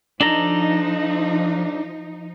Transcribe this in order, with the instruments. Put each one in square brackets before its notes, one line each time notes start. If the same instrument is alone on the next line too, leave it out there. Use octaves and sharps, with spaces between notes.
[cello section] F3 D#4 [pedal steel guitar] D4 A4 A#5